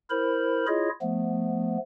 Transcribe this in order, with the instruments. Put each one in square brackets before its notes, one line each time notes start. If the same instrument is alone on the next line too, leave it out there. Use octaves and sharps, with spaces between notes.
[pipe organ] E4 A#4 C5 B5
E4 F4 G#4 C#5 D#5
F3 A3 B3